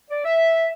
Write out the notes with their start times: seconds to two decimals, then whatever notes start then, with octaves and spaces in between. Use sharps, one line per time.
0.10 D5
0.25 E5